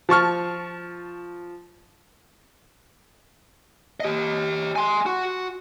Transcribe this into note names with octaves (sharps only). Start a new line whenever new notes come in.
F3 A5 C#6 F6
G4 D#5
G#5 C6
F#4